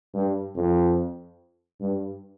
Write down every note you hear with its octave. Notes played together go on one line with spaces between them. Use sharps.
G2
F2
G2